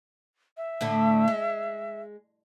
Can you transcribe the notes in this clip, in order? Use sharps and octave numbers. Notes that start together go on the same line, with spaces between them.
E5
A2 D3 A3
G#3